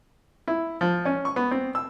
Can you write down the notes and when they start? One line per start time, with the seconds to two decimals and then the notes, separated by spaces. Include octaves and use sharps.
0.48 E4
0.81 F3
1.05 C#4
1.25 C#6
1.36 B3
1.51 C4
1.75 E6